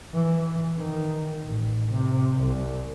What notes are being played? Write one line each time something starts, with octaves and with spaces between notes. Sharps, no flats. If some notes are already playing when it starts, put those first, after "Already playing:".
E3
D#3
A1
C3
C2